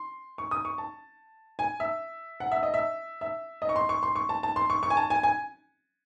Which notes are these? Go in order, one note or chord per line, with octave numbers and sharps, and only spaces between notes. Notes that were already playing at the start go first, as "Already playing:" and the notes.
Already playing: C6
C#6
D#6
C#6
A5
G#5
E5
F#5
E5
D#5
E5
E5
D#5
C#6
C6
C#6
C6
C#6
A5
A5
C6
C#6
C#6
G#5
A5
G#5
G#5